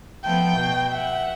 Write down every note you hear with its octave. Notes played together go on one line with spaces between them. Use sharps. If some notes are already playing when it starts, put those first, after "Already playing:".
F3 A3 B3 G5
B2
E5 F#5